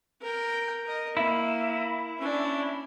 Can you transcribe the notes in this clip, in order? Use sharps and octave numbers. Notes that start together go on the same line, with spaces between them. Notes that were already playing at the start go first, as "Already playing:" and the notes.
A#4 G5
A#4 D#5
A#3 E4
C#4 D4